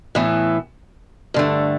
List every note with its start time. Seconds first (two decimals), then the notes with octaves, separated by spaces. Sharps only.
0.15 A2 E3 B3
1.34 G2 D3 A3